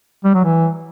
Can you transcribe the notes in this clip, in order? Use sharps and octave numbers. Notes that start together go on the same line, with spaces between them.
G3
F#3
E3